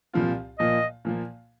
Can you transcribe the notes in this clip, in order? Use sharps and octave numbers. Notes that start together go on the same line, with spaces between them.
C2 A#2 F3 C4 F4
A#2 F3 A#3 D#5
A#2 F3 A#3